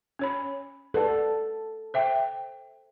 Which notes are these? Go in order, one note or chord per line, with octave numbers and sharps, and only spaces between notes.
C#4 C#5 B5
A4 B4 D5 F#5
C5 E5 G5